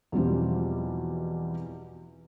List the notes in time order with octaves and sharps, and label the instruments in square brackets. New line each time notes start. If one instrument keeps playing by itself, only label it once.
[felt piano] E2 B2 F3 G3 C4